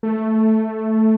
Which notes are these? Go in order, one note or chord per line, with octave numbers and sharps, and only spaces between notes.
A3